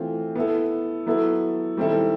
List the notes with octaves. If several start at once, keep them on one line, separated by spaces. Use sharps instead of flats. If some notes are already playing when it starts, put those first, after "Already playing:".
Already playing: E3 A3 C4 F4
B3 E4 A4
F#3 B3 E4 A4
D#3 G3 C4 E4 A4